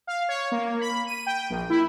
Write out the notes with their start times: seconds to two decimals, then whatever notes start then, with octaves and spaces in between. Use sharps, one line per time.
0.07 F5
0.29 C#5
0.52 A#3
0.81 B5
1.07 D#7
1.26 G5
1.50 A#1
1.70 E4